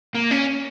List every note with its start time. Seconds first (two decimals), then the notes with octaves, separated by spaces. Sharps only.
0.15 A#3
0.31 C#4